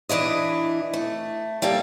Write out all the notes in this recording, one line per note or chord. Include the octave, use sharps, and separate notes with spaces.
E3 D4 E4 D#5
A3
G3 A#3 D4 A4